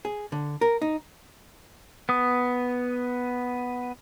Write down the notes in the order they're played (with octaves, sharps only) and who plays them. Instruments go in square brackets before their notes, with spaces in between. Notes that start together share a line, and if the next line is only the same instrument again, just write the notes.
[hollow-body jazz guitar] G#4
D3
A#4
D#4
[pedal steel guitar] B3 D#6